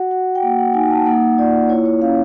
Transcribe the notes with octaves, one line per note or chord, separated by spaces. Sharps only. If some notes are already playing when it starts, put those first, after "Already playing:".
Already playing: F#4 F#5
F#4 F#5
G5
A#3 F#5
F#5
D#4 G#5
A5
A#3 F#5
F4 D5
E4 C#5
C#5
C#4 F5